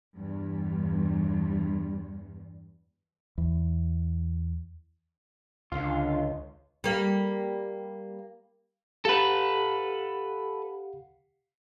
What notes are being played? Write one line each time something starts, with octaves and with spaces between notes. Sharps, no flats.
E2 G2
E2
C#2 D3 F4 F5
G3 A#3
G4 A4 B4 F5 F#5